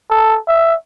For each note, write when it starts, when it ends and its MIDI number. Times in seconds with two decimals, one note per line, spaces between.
0.10 0.38 69
0.48 0.75 76